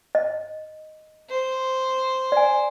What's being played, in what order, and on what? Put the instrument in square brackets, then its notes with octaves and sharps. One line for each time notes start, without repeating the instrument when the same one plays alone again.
[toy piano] D#5
[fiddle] C5
[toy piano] D5 G#5